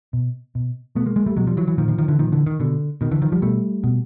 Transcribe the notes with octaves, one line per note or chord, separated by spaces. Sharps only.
B2
B2
B2 A3 B3
G#3 A#3
G#3 A#3
G3 A3
B2 F#3 G#3
F3 G3
E3 F#3
E3 F#3
A#2 D#3 F3
D#3 F3
D#3 F3
D3 E3
A#2 D#3 F3
D3 E3
D#3
B2 D3
B2 D#3
D3 E3
D#3 F3
F3 G3
B2 G3 A3
B2